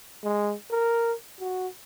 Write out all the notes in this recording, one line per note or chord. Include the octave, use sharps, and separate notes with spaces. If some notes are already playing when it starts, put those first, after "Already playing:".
G#3
A#4
F#4